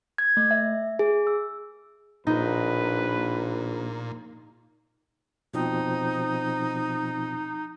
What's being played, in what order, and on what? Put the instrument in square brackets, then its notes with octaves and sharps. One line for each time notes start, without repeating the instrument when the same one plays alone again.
[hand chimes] G#6
A3
E5
G#4
E6
[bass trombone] A#1 [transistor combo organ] A#2 [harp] D#4 [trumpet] B4
[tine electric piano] B2 F3 C4 [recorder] D#4